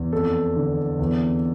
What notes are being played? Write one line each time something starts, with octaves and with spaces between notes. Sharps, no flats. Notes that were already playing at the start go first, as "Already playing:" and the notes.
Already playing: E2
F2 A4
D3
E2